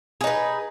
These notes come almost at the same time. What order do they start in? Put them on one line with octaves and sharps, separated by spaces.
G#4 D#4 B4